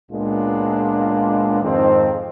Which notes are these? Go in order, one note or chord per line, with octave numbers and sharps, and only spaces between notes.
C#2 A#2 G#3 B3 D4 F4
F2 G#2 D#3 C4